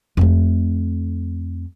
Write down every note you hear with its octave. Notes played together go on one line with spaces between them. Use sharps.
F2 A3